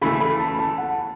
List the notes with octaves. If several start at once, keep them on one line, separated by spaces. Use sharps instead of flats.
C#3 E3 A3 B5
B5
A5
A5
F#5